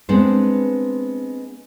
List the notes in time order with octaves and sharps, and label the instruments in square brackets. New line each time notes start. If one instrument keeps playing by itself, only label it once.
[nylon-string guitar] G#3 B3 C4 D4 B4 C5